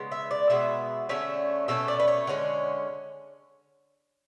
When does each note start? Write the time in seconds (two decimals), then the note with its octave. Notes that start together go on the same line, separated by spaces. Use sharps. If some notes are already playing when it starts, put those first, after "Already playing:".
Already playing: C#3 G#3 B3
0.11 E5
0.31 D5
0.50 B2 G#3 B3 E5
1.09 D3 A3 C#4 E5
1.68 B2 A3 C#4 E5
1.88 D5
2.00 B4
2.08 C#5
2.27 D3 G#3 C#4